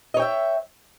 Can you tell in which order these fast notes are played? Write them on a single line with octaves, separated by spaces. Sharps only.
D#5 C#5 G5 E5